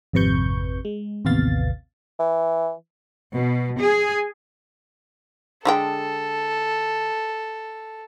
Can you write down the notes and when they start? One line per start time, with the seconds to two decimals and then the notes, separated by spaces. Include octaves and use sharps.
0.13 G#1 F2 C3 B4 C#6 G6
0.85 G#3
1.25 A1 D#2 C3 B3 F5 A6
2.19 E3
3.34 B2
3.77 G#4
5.65 D3 G#3 A4 G5